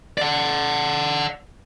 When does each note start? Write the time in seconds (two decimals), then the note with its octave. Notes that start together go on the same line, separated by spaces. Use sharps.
0.18 D5 F#5